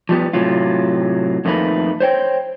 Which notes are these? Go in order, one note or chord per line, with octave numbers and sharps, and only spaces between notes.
F3 G3 B3
A2 C3 F#3 F4
F2 D#3 A3 A#3 B4
C5 C#5 G5